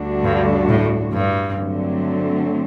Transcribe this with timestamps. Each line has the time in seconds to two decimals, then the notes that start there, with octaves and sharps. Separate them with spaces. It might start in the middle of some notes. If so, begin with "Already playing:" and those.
Already playing: D2 D3 G3 D4 F#4
0.24 G2
0.69 A2
1.13 G2
1.58 D3 F#3 A3 C4